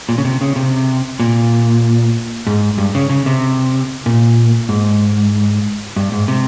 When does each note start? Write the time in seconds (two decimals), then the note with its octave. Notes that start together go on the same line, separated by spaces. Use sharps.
0.09 A#2
0.18 C#3
0.25 C3
0.41 C#3
0.56 C3
1.20 A#2
2.47 G#2
2.78 G2
2.95 C#3
3.10 C#3
3.26 C3
4.06 A#2
4.69 G#2
5.96 G2
6.12 G#2
6.28 C3